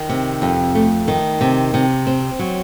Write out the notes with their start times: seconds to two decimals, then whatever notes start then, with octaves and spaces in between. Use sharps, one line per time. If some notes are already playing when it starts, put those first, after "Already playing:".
Already playing: D#3
0.09 C3
0.42 F2
0.75 A3
1.08 D#3
1.41 C3
1.74 C3
2.07 C4
2.39 F#3